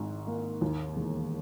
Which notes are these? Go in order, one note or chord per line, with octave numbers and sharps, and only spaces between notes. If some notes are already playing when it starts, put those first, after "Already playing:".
Already playing: G#1 G#2
A#3
D#2
E1